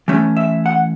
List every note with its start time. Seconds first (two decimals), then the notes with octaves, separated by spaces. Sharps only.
0.08 E3 A3 C#4
0.37 E5
0.66 F#5